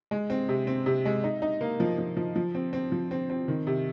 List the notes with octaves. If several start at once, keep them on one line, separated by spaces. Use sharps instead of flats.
G#3
C4
C3
C4
C3
G#3
D#4
D#4
A#3
F3
F3
F3
F3
C4
C4
F3
C4
C4
D#3
C3